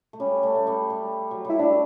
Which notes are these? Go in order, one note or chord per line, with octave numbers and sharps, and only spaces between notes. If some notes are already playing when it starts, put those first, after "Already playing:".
A3
G3 C#4
A3
A3
G3
G3
F#3
G3 E4
A3 D4